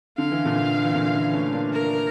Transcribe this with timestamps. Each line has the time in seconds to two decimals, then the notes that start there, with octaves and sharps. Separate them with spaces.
0.18 D3 F5
0.32 E3
0.45 A#2 D3
0.85 E3
0.95 A#2 D3
1.14 C#3 E3
1.33 A3 C#4
1.53 A#3 D4
1.72 A#4